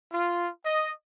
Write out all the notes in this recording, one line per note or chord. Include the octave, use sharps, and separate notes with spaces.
F4
D#5